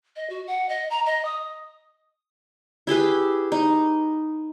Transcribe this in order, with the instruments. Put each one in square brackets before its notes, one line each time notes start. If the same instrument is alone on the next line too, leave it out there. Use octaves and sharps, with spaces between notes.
[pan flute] D#5
F#4
F#5
D#5
A#5
D#5
D#6
[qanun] E4 G4 G#4 B4
D#4